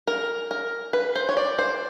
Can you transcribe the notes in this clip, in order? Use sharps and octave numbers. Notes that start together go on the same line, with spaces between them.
A#4
A#4
B4
C5
C#5
D5
C5